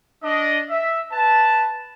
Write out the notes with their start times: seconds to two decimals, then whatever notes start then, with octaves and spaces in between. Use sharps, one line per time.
0.23 D4 D#5
0.68 E5
1.13 B4 A5